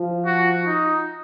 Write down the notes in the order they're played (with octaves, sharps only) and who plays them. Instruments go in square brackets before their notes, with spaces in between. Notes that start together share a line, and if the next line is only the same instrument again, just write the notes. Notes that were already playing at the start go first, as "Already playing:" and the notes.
Already playing: [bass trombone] F3
[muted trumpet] F#4
D#4